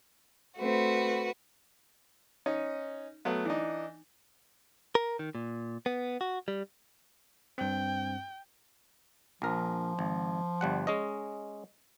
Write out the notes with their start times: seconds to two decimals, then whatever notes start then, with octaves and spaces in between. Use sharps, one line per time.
0.58 A3 C4 F#4 B4
2.46 C#4 D#4
3.25 F#3 A3 B3
3.45 E3 D4 D#4
4.95 A#4
5.19 D#3
5.35 A#2
5.86 B3
6.21 F#4
6.48 G3
7.58 G2 C4 G5
9.42 A#1 F3 A#4
9.99 G#1
10.61 G1 G3 F#5
10.87 G#3 C#4 D#5